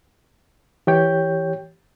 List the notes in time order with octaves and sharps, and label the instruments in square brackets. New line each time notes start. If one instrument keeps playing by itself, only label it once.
[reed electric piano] E3 G4 C#5 G5 G6